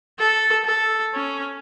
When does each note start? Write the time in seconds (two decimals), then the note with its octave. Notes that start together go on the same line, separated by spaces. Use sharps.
0.19 A4
0.64 A4
1.14 C#4